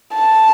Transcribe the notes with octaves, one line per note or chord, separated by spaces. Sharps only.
A5